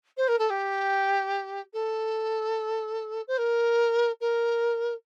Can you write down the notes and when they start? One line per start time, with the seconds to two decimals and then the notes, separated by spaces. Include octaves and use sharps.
0.17 C5
0.28 A#4
0.38 A4
0.50 G4
1.73 A4
3.27 C5
3.38 A#4
4.20 A#4